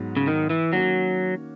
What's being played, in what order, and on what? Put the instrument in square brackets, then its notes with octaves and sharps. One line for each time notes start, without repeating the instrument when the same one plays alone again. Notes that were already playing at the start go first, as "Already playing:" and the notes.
Already playing: [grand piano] G#2 F#3 B3
[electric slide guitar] C#3
D#3
E3
[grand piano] D#3 A#3 C#4 F#4 C#5 [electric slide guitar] F#3